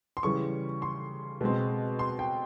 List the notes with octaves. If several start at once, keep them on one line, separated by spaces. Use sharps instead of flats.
C6
C#3 E3 G3 C#6
C6
B2 G#3 C4
C6
G5